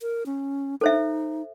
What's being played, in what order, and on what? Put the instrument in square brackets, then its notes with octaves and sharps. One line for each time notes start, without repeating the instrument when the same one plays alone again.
[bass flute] A#4
C#4
[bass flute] D#4 [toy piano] A4 C5 E5